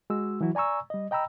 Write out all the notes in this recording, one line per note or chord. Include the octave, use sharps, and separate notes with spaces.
G#3 F#4 E6
E3 F#3 E4 F#4
D5 G#5 A#5 C#6 E6
G3 D#5
D#5 G5 A#5 B5 E6